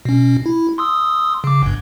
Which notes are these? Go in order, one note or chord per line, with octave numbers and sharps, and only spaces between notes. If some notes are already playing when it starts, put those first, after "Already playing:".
B2 C#4
E4
C6 D#6 E6
C#3 D6
G1 G2